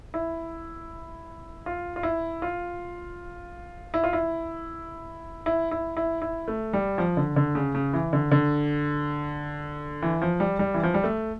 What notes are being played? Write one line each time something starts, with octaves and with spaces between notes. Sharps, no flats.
E4
F4
F4
E4
F4
E4
F4
E4
E4
E4
E4
E4
A3
G3
F3
D3
D3
C#3
C#3
E3
D3
D3
E3
F3
G3
G3
E3
F3
G3
A3